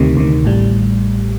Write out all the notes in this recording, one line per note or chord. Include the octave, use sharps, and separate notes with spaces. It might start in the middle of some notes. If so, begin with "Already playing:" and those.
Already playing: D2 C3 D#3
D2 C3 D#3
A1 A2 G3